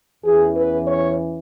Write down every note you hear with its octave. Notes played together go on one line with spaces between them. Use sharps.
E2 E3 C#4 G#4
B4
C#5